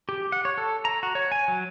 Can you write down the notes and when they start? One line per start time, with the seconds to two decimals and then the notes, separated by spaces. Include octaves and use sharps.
0.09 G4
0.32 F#5
0.45 C#5
0.58 A4
0.85 A#5
1.03 F#4
1.15 C#5
1.32 G#5
1.48 F#3